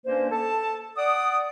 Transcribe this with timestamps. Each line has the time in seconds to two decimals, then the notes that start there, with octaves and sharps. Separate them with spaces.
0.05 G2 A#3 C#4 D4 C5
0.30 A4 A5
0.97 D5 F#5 D#6